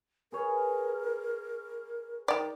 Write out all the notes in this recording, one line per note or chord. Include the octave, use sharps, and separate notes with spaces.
G#4 A#4 B4 C#5
D#3 D5 G5